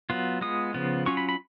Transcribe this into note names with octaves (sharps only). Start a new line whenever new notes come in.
F#3 B3 F4
G#3 B3 F4 D#6
C#3 F3 B3 F4
F#3 C#4 F4 C#6
B5
B5